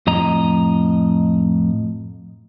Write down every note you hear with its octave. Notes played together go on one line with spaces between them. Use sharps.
F2 A2 D#5 A#5